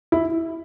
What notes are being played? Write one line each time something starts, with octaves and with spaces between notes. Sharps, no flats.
E4